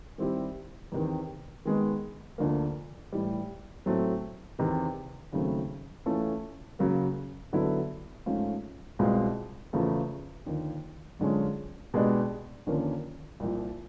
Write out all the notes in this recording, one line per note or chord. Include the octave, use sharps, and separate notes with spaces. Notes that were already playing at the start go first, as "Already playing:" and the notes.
D#3 G3 C4 E4 G4
E2 C3 D#3
D#3 G#3 B3
D2 D3 F3 A#3
A2 E3 G3
A2 F#3 A3 C4
E2 C3 D#3
D#2 C#3 F#3 A3 C4
E3 A3 C#4 F4 A4
C#3 F#3 A#3
D3 F#3 B3 E4 A4
G#2 F3 A3 C#4 F4
C2 B2 G#3 C4 F4
E2 C#3 F3 A3
D#2 D3 F3
F#2 D3 F3 G#3 C#4
B2 G#3 B3 D4 G4
D#2 D3 F3 A#3 C#4
C2 A#2 F3